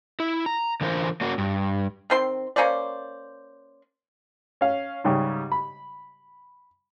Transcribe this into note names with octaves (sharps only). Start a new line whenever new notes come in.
E4
A#5
D3 E3 F4 A#4 C5
A#3 C#4 F#4
G2
D#3 C4 C6
A#3 C#4 C5 D5
C#4 F5
G#2 C#3 G3
B5